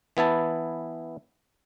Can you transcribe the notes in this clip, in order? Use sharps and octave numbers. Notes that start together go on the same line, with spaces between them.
E3 B3 E4 A5